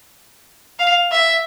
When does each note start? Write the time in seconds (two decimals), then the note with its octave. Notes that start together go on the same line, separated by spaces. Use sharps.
0.79 F5
1.12 E5